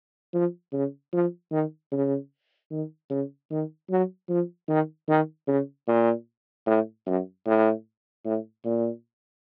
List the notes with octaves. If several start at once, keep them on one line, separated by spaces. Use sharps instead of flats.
F3
C#3
F3
D#3
C#3
D#3
C#3
D#3
F#3
F3
D#3
D#3
C#3
A#2
A2
F#2
A2
A2
A#2